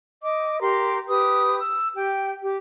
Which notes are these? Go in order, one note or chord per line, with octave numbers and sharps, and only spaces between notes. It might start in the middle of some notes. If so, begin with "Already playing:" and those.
D#5 D6
G4 A#4 A#5 C6
G4 B4 D#6
E6
G4 G5
G4